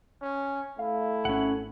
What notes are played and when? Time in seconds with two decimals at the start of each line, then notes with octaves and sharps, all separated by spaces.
0.22 C#4
0.79 A3 E4 F5
1.25 G#1 C#4 F#5